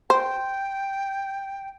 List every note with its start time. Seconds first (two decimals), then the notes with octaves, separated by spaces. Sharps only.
0.10 C5 G5